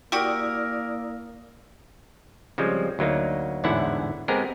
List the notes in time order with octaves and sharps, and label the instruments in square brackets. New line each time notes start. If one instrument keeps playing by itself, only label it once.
[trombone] A#3 [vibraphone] E4 D5 D#6 [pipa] F#4 G4 [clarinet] A#4
[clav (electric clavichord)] C#3 F3 G3 G#3 C4
D2 F#3 A#3 D#4
A1 E2 G#2 D3 E4 F#5
G#3 B3 C4 G4 G#4 A#4